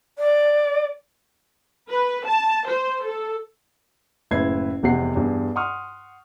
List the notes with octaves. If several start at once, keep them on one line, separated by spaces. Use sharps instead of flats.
D5
B4
A5
C5
A4
F#1 A2 E4 B4 G#6 C7
F1 E2 C3 F#5 C7
E2 G2
F#5 C6 C#6 D#6 F6